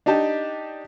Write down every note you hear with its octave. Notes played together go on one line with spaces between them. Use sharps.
D4 D#4 G4 A5